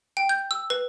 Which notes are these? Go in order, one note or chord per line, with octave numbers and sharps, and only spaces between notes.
G5
G6
E6
B4